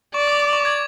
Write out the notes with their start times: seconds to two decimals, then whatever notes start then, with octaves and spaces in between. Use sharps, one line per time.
0.14 D5 C#6
0.28 D6
0.40 D6
0.53 C#6
0.65 G#6